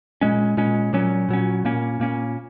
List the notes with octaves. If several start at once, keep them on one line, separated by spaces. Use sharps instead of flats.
A#2 G#3 C#4
A#2 G#3 C#4
A#2 F#3 C#4
A#2 F#3 C#4
A#2 A#3 C#4
A#2 A#3 C#4